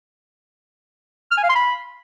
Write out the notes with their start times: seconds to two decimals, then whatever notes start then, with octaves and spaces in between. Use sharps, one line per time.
1.32 F6
1.38 G#5
1.44 F5
1.50 C6
1.56 B5